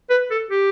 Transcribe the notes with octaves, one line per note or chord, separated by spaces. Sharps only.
B4
A4
G4